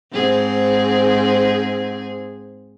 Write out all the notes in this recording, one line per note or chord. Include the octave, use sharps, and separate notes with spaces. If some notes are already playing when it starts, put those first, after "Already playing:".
G#2 C4 G#4